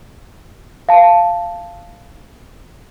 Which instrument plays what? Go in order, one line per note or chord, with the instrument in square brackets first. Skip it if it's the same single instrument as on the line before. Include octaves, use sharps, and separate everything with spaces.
[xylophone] F5 A5